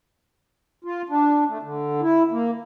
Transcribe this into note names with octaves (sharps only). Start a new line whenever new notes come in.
F4
D4
A3
D3
E4
A#3